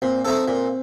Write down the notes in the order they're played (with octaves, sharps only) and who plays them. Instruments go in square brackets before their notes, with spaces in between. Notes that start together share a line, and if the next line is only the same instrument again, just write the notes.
[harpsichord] A#2 [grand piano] C4
[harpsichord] A3 D#4 A4 [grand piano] C4
[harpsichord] A#2